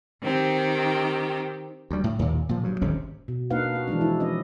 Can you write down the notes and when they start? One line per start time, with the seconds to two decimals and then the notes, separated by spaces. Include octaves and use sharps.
0.22 D#3 C4 G4
1.91 D2 G3
2.04 A2
2.19 D#2 A#2
2.49 A#2 F3
2.64 G2 F#3
2.81 D#1 G#1 C3 C#4
3.28 B2
3.50 A#3 D4 D#4 B4 F5 F#5
3.75 F#4
3.87 E3 F3 G#3 D4
4.01 E4
4.20 F3 C#4 D#5